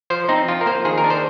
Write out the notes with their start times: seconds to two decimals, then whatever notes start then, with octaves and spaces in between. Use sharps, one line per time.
0.10 F3 C5
0.29 C4 D#4
0.48 F3 F4
0.61 A#4
0.66 A#3 C5
0.85 D#3 G#4
0.98 A#4
1.04 D4
1.10 C5